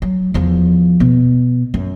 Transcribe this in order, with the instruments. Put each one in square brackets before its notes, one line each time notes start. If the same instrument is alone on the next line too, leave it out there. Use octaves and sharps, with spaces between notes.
[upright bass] F#3
E2 F3
B2
F#2